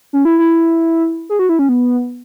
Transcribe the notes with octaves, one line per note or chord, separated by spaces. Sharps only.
C#4
E4
E4
G#4
F#4
E4
C#4
B3